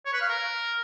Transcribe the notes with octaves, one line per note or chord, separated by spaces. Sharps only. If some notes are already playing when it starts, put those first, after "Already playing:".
C#5
B4
F5
A#4